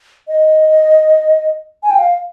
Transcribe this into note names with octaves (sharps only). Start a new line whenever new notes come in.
D#5
G#5
G5
F5